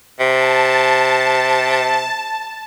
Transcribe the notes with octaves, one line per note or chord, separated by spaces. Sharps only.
C3 A5